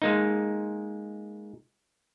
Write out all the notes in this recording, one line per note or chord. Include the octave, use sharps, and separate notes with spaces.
G#3 A#3 D#4